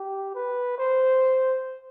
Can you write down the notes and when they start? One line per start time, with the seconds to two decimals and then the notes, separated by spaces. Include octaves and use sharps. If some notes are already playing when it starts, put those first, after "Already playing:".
Already playing: G4
0.34 B4
0.78 C5